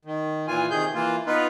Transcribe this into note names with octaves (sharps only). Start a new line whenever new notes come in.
D#3
A#2 E3 F4 G#5
C3 D#3 G#4 G6
E3 A#3 F4
B3 D#4 F4 B4